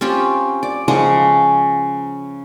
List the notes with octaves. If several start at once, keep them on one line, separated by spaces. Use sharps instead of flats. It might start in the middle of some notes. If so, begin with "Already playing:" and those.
C4 C#4 F4 G4
D5
C#3 F3 G#3 F#5